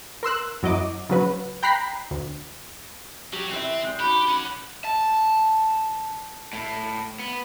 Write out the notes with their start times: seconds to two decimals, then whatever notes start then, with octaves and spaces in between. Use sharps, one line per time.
0.23 A#4 C6 E6 F#6
0.63 F#2 F#3 E4 D#5 D6
1.09 C#3 F#3 B4
1.63 G5 A#5 B5 F#6 B6 C7
2.11 D2
3.33 F#3 F#4 G4
3.51 E3 C4 B4 E5
3.84 G3 G#3
4.00 D#4 F#4 G4 B5
4.28 C#4 F#5
4.85 A5
6.53 A2
7.20 B3